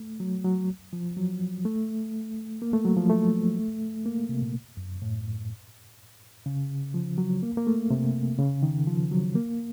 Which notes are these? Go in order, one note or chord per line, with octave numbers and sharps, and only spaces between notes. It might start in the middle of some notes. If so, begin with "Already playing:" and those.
Already playing: A3
F#3
F#3
F3
F#3
A3
A#3
A3
F#3
F3
A3
A#3
C3
A#2
F#2
A2
C#3
F3
F#3
A#3
A#3
A3
C3
C#3
D#3
F3
F#3
A#3